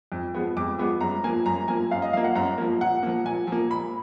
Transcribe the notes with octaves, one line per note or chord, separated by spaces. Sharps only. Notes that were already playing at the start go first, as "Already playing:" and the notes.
F2
F3 G#3 B3
F2 D6
F3 G#3 B3
F#2 A#5
F3 A#3 G#5
F#2 A#5
F3 A#3 G#5
F#2 F5
D#5
F3 A#3 F5
F#5
F#2 A#5
F3 A#3
A#2 F#5
F3 A#3
A#2 G#5
F3 A#3
A#2 B5